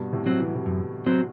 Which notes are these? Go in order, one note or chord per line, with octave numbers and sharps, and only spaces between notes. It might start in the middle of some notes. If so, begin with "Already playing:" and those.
Already playing: G2 B2
A2 C3
F#3 C4 F#4 C5
E3
F#3
C3 E3
F#2
F#3 C4 F#4 C5